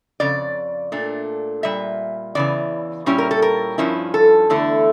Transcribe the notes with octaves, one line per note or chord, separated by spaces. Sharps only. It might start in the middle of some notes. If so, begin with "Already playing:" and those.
F2 C#3 D5
A#2 A3 D4
A#2 G3 E5
E2 C#3 E3 D5
A#2 G3 C#4 E4
A#4
A4
A#4
G2 F3 C#4 E4
A4
E2 D3 A3 E4